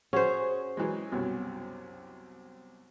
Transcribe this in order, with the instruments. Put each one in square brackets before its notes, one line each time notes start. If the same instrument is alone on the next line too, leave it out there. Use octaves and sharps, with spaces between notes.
[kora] C#4 C5 [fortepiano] F#4 G#4
[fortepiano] E3 F#3 G#3
C2 F#2 B2